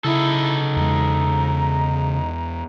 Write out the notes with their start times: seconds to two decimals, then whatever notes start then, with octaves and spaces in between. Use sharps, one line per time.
0.04 C#3 D#4 E4 A4
0.76 E2 G#3 A#5